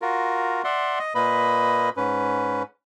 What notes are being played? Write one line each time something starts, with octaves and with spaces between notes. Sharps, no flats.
F4 F#4 A#4
D5 E5 F#5 C6
D#5
A#2 A#3 B4 D#5 B5
G#2 C#4 B4